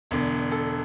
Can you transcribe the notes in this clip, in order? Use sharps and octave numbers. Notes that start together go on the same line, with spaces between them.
E1 E2 D3
A4